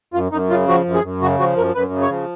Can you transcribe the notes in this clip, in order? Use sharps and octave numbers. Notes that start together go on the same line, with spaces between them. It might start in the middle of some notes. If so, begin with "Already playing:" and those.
F#2 F4
F#2 D#4
C#3 F4
F3 F#4
F#2
G#4
F#2
C#3 F#4
F3 F#4
F#2 A#4
F#2 B4
C#3
C#5
F3